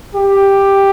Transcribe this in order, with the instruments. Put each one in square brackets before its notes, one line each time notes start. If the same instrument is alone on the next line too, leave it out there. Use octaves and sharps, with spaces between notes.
[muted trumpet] G4